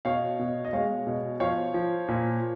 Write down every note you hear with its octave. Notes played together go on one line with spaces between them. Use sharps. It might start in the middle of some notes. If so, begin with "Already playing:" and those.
B2 C#5 F5
B2
D#5
G#3 C#5 F5
B2
F3 C#5 F5
F3
A#2